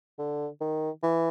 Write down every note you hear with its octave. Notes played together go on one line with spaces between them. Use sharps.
D3
D#3
E3